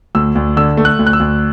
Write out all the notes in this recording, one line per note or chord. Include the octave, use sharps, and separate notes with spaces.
D2 E6
D2
D3 E6
A3
F#6
D2
F#6
E6
D2